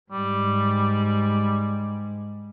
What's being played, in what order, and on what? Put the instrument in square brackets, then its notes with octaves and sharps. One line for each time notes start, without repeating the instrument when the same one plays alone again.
[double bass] G#2 G#3 [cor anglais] G3